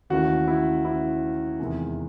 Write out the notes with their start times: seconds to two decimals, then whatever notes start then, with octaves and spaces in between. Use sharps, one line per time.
0.10 D#2 C#3 E3 A3 F#4
0.48 E4
0.85 E4
1.59 E2 C3 D#3 G#3